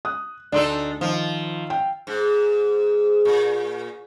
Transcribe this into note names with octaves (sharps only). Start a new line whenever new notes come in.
D#6 F#6
D2 D4 D#4 A4 C6 E6
D#3 F3 F4 D#5
G5
G#2
A#2